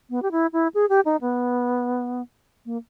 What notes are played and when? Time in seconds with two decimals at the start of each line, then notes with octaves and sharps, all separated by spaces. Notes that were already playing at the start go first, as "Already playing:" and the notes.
0.10 B3
0.22 G4
0.32 E4
0.53 E4
0.74 G#4
0.89 G4
1.05 D#4
1.21 B3
2.65 A#3